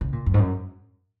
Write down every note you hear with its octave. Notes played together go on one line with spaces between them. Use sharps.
C#3
A#2
F#2
G#2
F#2